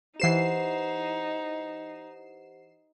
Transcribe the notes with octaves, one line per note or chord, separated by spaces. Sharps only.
E3 D#4 G4 C5 F#5 C7 E7